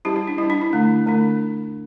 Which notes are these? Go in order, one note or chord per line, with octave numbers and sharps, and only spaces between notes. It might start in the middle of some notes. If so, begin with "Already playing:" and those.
G3 C#4 E4 G4
E4
D4
G3 C#4 E4
D4
E4
D3 A3 D4
D3 A3 D4